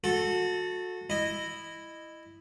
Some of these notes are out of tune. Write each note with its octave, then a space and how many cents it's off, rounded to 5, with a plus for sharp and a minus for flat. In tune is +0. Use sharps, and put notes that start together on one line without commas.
F#4 -25 A4 +0
E4 +0 D#5 -15